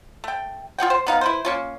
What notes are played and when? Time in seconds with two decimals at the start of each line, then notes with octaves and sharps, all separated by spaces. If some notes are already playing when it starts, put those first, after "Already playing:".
0.24 A3 G5
0.78 F4 G#4 F#5 G5
0.90 C5
1.07 B3 D#4 F5
1.21 E4 B4 C5
1.45 A#3 C#4 F4